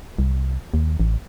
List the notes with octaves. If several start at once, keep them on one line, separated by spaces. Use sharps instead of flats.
C2
D#2
A1